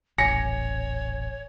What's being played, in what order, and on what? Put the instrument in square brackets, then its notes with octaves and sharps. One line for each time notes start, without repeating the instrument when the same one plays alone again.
[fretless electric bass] D#1 A1 [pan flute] C#5 [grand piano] G#5 A#6 C#7